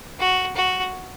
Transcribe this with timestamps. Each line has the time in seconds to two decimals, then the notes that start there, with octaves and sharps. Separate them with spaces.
0.19 F#4
0.55 F#4